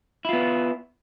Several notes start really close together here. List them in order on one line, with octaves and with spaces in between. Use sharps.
E4 F4 B3